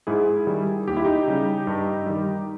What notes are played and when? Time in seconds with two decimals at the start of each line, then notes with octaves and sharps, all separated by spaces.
0.07 G#2 E4 G#4
0.47 D#3 G3
0.88 D#2 G4
0.97 E4
1.05 D#4 G4
1.27 C#3 G3
1.67 G2
2.06 D#3 G3